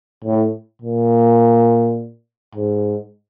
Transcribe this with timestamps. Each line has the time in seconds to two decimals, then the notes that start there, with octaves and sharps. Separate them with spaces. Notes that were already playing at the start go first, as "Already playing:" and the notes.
0.24 A2
0.82 A#2
2.56 G#2